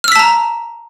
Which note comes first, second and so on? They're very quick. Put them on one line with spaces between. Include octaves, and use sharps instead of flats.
F6 E6 B6 A5 A#5